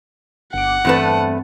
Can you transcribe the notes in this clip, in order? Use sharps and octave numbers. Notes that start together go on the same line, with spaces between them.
G1 F#5 D6
E2 G2 A3 C4 B4 A5